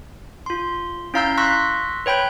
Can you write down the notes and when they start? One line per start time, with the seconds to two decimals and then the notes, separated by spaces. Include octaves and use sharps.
0.46 F4 C6
1.14 C#4 E4 F5 A#5 E6 G6
1.37 C6 C#6 E6 F#6 A#6 B6
2.06 B4 C#5 G5 B5 G6